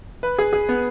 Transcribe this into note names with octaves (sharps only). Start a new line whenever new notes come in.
B4
G#4
G#4
B3